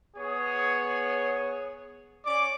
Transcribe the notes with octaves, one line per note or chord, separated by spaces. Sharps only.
B3 G#4 C#5
C#4 D5 D6